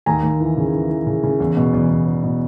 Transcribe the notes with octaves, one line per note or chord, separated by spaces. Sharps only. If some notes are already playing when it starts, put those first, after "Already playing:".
D#2 G#5 A#5
D#2
E3
C#3
E3
E3
C#3
C#3
E2
B2
E2
E2
E2
B2